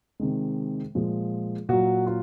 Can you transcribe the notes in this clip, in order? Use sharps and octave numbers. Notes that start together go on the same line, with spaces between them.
C3 D#3 G#3
A#2 F3 G#3
A#2 F#3 F#4
F4